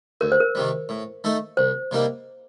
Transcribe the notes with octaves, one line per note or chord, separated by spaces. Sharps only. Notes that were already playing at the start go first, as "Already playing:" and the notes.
D2 A#4
C5
A#4
C3 D#3 G3
A2
A3 D#4 A4
C2 C5
C3 G3 A#3 D#4